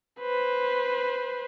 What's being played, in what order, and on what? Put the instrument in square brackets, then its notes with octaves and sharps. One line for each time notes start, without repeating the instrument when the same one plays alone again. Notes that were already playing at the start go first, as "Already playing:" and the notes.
[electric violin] B4 C5